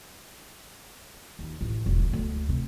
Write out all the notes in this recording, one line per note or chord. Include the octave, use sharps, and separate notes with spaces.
D#2
A1
E1
D3
D2
C3